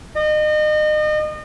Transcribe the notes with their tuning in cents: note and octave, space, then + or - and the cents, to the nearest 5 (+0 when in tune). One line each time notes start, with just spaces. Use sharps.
D#5 -35